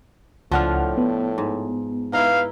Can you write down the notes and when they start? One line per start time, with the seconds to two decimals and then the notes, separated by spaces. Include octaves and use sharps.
0.52 C#2 A2 F3 D4 F4 F#5 F6
0.98 B3
1.38 G#2
2.13 D#4 E4 B4 F5